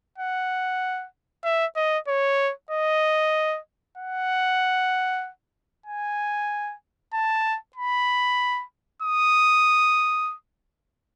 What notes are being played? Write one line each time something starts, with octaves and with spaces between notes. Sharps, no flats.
F#5
E5
D#5
C#5
D#5
F#5
G#5
A5
B5
D#6